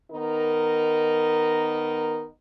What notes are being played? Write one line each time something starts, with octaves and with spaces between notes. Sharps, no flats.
D#3 B3 D#4 A#4